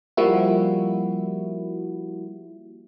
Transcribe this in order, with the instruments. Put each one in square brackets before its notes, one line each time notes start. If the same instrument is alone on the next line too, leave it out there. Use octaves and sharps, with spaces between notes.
[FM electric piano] F3 G3 A#3 E4 F#4